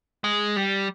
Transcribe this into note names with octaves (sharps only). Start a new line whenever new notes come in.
G#3
G3